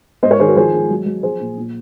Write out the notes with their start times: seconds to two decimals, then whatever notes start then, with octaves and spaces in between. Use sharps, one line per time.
0.23 G#2 C5 D#5
0.31 A#4 C#5
0.40 D#3 G#4 C5
0.47 F#4 A#4
0.56 F3 G#4 C5
0.73 G#3
0.90 F#3
1.06 F#3
1.23 F3 G#4 C5
1.40 A#2
1.57 A#2